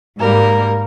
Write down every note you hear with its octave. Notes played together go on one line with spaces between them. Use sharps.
G#2 G3 A#3 A#4